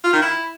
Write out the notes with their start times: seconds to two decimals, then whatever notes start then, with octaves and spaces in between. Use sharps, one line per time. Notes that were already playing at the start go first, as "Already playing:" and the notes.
0.04 F4
0.13 D#3
0.22 E4